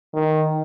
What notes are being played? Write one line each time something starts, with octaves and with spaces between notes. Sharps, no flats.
D#3